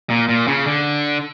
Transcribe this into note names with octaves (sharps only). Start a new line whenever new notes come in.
A#2
A#2
C#3
D3